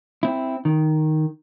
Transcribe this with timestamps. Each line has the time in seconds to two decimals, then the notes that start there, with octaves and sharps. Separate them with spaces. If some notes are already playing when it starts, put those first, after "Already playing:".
0.23 C4 E4
0.65 D#3